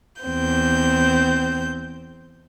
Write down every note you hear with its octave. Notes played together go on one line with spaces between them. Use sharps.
E2 C4 G6